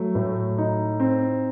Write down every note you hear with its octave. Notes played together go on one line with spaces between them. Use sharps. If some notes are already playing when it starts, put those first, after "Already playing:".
Already playing: F#3 A3
A2
D#4
C4